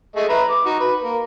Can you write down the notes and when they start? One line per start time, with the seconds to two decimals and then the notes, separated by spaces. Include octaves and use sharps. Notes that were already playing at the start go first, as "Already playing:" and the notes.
0.16 A3 G#4 D#5
0.29 B4 E5 A#5
0.50 D6
0.65 D#4 F#4
0.80 B4
1.02 A#3